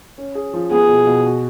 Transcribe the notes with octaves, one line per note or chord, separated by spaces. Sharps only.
C#4
G#4
F3
B3 G#4
B2
B2
F#4